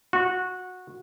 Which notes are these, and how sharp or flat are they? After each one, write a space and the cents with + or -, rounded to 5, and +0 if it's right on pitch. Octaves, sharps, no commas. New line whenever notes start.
F#4 -15